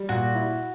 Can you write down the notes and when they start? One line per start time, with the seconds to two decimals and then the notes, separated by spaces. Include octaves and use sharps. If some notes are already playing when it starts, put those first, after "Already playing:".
Already playing: G3
0.09 A#2 F#4
0.35 E4